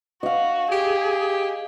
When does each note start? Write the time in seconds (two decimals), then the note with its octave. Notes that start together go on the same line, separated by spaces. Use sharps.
0.23 F#4 D#5 F5
0.72 G4 G#4